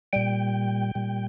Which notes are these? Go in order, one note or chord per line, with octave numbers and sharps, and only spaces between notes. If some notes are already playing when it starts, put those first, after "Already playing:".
A#2 G3 G5
A#2 G3